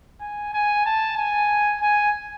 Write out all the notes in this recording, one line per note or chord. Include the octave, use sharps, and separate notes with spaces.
G#5
G#5
A5
G#5
G#5